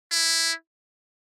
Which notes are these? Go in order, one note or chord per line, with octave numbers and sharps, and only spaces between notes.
E4